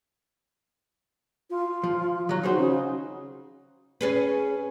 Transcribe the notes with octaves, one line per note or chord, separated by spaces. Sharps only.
F4
F3
D#3 F#3
F#3 D#4 G#4 C5
C#3
C#4 G#4 B4